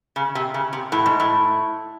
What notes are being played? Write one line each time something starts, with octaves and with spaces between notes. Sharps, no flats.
C#3
C3
C#3
C3
A2
G#2
A2